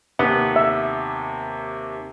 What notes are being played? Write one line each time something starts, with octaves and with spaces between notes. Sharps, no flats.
D#2 C3 B3
E5